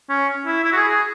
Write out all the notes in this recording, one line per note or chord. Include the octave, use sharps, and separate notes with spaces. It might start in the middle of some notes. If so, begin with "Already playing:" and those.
C#4
E4
E4
F#4
G#4
G#4